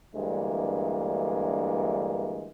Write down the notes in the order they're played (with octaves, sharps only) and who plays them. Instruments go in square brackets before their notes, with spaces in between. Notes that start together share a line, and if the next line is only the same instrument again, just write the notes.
[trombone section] D2 G2 E3 G#3 A#3